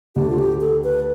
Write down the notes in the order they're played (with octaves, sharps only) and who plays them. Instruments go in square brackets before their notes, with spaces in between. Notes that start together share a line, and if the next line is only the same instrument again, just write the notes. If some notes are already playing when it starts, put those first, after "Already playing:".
[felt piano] D2 D3 A3 D4 [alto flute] G4
[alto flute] F4
G4
A4
B4